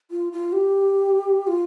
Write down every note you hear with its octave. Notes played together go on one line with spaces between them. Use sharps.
F4
F4
G4
F4